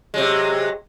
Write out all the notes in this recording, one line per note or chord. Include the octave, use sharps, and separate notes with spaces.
C3 F#3 G#3